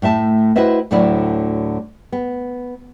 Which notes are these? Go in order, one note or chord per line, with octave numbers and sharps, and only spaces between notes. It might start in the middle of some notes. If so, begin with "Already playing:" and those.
A2 A3 E5 A5
E4 F#4 B4 C5 D#5 E5
D2 A2 D3 F#3 E4 D5
B3